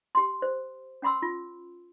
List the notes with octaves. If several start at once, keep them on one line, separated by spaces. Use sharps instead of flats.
G4 C6
C5
C#4 F#5 B5 C6 E6
F4